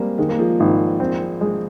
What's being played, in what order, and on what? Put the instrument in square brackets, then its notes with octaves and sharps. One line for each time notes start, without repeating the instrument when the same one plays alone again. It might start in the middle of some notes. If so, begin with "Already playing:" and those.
Already playing: [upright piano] G3 G#3 A#3 C4
[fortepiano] D#3 [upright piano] G#3
[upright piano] A#3
F3 G#3
[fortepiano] G#1
C4
G#3